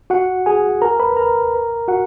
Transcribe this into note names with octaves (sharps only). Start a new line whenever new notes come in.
F#4 F#5
G#4 G#5
A#4 A#5
B4 B5
A#4 A#5
F#4 F#5